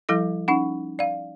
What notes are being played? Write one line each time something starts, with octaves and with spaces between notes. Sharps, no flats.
F3 G3 E4 A4 A#6
C#4 D#4 F#5
D5 F5